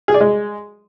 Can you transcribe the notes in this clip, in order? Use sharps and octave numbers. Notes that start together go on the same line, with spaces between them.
G#4
D5
G#3